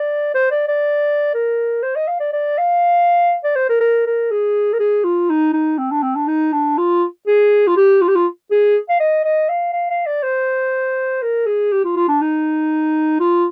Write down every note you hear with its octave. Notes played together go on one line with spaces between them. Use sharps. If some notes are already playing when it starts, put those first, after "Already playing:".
Already playing: D5
C5
D5
D5
A#4
C5
D#5
F5
D5
D5
F5
D5
C5
A#4
A#4
A#4
G#4
A#4
G#4
F4
D#4
D#4
C4
D4
C4
D4
D#4
D4
F4
G#4
F4
G4
F4
G4
F4
G#4
F5
D#5
D#5
F5
F5
F5
D5
C5
A#4
G#4
G4
F4
F4
D4
D#4
F4